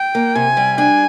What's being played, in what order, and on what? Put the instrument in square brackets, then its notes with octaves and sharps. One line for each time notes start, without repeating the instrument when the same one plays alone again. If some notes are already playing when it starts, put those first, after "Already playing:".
Already playing: [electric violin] G5
[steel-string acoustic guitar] A#3
[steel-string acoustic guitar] C3 [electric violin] G#5
[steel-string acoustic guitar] G3
[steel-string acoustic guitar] D4 [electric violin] G#5